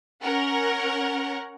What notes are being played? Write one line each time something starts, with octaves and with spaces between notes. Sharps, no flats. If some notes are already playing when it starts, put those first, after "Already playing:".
C#4 A#4 F#5